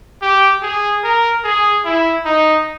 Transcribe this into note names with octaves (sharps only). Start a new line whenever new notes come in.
G4
G#4
A#4
G#4
E4
D#4